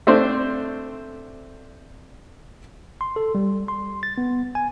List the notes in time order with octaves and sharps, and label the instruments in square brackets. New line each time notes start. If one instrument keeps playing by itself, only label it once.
[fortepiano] A3 C4 D4 C5
[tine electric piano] C6
A4
G3
C6
A6
B3
G#5